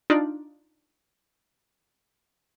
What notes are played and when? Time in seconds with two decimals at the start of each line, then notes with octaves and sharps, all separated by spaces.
0.10 D4 D#4 F4 D5